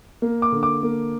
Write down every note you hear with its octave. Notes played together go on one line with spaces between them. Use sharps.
A#3
D6
D3
D6
A#3